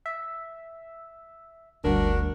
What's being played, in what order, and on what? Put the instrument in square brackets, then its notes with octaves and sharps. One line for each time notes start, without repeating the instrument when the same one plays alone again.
[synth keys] E5
[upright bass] G1 G3 [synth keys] D2 [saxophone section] D4 F#4 A#4